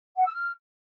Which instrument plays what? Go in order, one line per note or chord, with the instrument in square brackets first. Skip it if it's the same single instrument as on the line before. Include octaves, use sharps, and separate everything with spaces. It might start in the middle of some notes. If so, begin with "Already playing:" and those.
[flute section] F#5
E6
F6